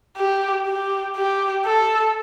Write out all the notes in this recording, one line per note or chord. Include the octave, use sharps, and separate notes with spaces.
G4
G4
G4
A4